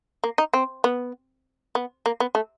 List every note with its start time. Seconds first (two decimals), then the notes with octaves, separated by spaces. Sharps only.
0.24 A#3
0.38 D#4
0.54 C4
0.84 B3
1.75 B3
2.06 A#3
2.20 B3
2.35 A3